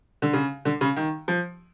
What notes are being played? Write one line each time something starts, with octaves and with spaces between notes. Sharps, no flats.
D3
C#3
D3
C#3
D#3
F3